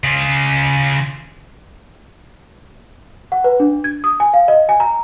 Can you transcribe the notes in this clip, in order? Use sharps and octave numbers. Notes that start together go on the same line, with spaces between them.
C#3 F4
F#5
B4
D4
G#6
D#6
G#5
F5
D#5
G#5
A#5